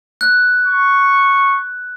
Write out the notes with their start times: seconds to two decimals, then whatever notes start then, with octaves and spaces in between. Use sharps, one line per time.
0.21 F#6
0.66 C#6